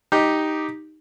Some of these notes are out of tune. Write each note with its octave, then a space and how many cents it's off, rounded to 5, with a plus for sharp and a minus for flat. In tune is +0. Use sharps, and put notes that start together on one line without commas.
D#4 +0 G4 +0